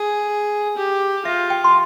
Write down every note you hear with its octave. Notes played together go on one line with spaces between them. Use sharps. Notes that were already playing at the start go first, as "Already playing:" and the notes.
Already playing: G#4
G4
F4 E5
G5
C6